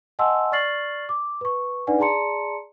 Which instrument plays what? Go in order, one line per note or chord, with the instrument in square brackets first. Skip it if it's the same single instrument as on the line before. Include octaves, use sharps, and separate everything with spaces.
[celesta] D#5 F#5 G#5 A5 C6 E6
D5 C#6 F6 A6 C7 F#7
D6
B4 C#6
D4 D#4 B4 D5 F#5 G#5
G#4 D5 A5 A#5 C6 C#7